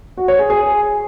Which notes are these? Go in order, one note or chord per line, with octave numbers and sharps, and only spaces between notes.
F#4
C#5
G#4
G#4